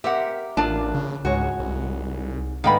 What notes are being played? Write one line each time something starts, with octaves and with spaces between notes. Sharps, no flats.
C4 G4 A#4 E5 F#5
A1 A#3 D4 F4 A5
C#3
C#2 G#2 F#4 C#5
C2
G#2 D3 D#3 B3 F5 G5 B5